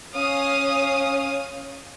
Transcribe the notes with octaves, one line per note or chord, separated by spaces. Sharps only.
C#4 C#5 F5 D#6